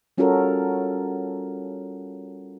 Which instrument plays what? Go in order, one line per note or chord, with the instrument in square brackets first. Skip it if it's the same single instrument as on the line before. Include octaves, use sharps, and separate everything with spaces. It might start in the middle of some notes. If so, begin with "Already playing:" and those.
[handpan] G3 C#4 F4 F#4 A4 A#4